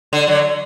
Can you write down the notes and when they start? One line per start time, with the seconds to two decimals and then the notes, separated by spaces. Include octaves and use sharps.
0.13 D3
0.27 D3 F#3